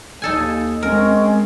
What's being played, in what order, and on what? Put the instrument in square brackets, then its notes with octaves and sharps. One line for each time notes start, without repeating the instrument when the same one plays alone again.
[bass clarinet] D#2 [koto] D#4 A4 G#5
[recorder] G#3 [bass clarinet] C4 [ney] C#4 [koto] A#4